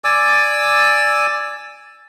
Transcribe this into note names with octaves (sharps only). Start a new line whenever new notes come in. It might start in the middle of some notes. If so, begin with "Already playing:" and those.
D5 G#5 D6 E6